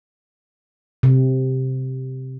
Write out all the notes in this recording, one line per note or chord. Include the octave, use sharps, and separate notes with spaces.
C3